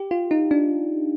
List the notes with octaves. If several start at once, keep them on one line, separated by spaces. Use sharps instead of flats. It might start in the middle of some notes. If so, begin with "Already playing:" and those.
Already playing: G4
F4
D#4
D4